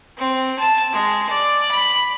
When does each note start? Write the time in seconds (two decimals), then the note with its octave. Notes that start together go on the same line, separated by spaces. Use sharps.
0.18 C4
0.59 A5
0.93 G#3
1.30 D5
1.71 B5